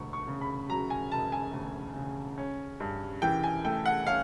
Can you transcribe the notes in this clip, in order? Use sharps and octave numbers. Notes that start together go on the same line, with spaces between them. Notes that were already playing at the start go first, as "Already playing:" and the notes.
Already playing: E1 D2 C#6
C#6
C#3
B5
F#3 A#5
G#5
E1 A5
G#5
D2
C#3
C#4
G2
E3 G5
G#5
A3 G5
F#5
C#4 F5